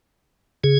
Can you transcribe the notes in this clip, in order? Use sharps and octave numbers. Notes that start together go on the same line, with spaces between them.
C#3 G#4